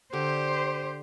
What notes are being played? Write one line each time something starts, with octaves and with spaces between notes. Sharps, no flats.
D3 G4 C5